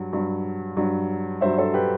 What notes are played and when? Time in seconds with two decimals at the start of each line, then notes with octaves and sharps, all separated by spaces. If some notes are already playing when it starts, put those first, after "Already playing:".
Already playing: G2 F#3
0.13 G2 F#3
0.77 G2 F#3
1.41 G2 F#3 C5 E5
1.58 A4 C5
1.74 G4 B4